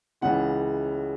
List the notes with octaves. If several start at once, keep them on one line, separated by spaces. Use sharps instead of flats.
C#2 C#3 E3 F#5